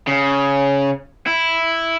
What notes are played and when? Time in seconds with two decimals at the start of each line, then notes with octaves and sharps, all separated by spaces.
0.08 C#3
1.27 E4